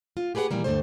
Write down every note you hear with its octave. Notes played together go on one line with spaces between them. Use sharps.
F4
G4 G#4 B4 C5 F#5
A#2 D#3 E3 G3 A#3
D2 G2 D3 D#3 A3 C5